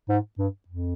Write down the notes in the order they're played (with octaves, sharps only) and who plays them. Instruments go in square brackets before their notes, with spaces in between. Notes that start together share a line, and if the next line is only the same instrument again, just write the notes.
[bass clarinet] G#2
G2
F2